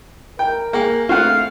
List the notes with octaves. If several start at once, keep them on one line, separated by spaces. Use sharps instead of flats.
A#4 G5
A#3 G#4 G5 G#5
A3 C4 D4 F4 F5 F#5